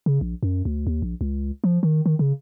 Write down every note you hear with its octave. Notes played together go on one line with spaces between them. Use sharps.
C#3
A#1
F#2
D2
D#2
A#1
C#2
F3
D#3
D#3
C#3